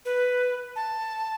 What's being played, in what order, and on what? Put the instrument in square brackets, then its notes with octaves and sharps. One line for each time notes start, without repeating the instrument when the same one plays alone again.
[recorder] B4
A5